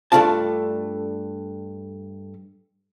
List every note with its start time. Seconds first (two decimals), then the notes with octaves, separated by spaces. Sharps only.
0.12 G2 F3 A3 D4 F4 A5